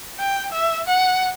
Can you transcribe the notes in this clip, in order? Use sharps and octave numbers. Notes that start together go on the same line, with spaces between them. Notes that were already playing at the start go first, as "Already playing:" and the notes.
G5
E5
F#5